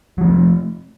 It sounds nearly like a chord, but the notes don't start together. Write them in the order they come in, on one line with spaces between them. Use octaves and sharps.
F#3 F3 A3